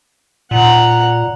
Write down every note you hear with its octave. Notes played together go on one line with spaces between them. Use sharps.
A#2 F#5 A#5